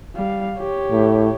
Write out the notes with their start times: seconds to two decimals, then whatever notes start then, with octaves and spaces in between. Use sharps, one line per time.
0.15 G3 F5
0.58 G4 C#5
0.91 A2